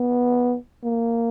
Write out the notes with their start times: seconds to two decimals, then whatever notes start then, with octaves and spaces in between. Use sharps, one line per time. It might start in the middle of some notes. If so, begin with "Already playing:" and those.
Already playing: B3
0.84 A#3